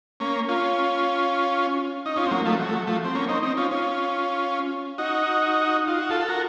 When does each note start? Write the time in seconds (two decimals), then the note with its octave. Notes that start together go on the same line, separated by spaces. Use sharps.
0.20 A#3 C#4
0.48 C#4 F4
2.06 D#4
2.16 C#4 F4
2.27 C4
2.31 F#3 A#3
2.45 F3 A3
2.59 F#3
2.69 A3
2.73 F#3
2.87 F3 A3
3.04 C4
3.15 A#3 C#4
3.29 C4 D#4
3.43 C4 D#4
3.57 C#4 F4
3.71 C#4 F4
4.98 D#4 F#4
5.87 F4
5.98 F#4
6.10 F4 A4
6.20 A4
6.28 F#4 A#4